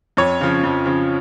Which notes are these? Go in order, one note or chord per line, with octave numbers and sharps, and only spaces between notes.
F2 C#5
C#3 F3
F2
C#3 F3